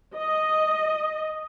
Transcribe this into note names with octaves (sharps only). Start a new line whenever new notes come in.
D#5